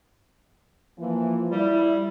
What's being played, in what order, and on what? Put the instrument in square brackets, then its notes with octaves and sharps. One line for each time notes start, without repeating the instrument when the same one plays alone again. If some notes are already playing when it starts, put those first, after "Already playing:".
[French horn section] E3 F3 A#3
[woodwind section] G3 [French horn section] E4